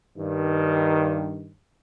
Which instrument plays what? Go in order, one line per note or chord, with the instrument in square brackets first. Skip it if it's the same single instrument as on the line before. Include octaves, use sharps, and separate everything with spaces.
[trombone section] G2 D#3